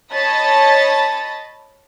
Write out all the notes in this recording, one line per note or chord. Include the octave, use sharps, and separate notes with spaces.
C#5 D#5 A5 B5 A6